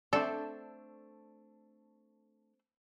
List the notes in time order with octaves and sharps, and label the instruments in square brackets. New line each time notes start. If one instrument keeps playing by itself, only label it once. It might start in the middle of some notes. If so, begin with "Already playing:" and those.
[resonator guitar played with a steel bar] A3 D4 E5 [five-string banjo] C4 D5 [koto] A4